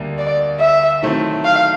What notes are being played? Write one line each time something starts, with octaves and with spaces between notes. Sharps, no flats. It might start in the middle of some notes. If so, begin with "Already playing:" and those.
Already playing: D2 D3 G3 A#3 D4
D5
E5
D#3 F#3 A3 C4 E4
F5